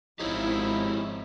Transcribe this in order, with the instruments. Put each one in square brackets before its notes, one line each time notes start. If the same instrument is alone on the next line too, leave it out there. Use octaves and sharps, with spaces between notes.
[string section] G#1 [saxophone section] F3 D#4 E4 [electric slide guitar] G4 G#4 C#5